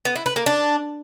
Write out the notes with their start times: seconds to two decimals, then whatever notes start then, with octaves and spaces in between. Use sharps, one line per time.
0.05 B3
0.16 E4
0.26 B4
0.36 A#3
0.46 D4